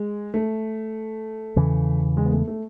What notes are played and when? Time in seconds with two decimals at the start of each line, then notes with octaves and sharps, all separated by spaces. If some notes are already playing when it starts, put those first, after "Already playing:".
Already playing: G#3
0.34 A3
1.56 E2 C#3 E3
2.17 G#3
2.25 B3
2.32 A3
2.48 A3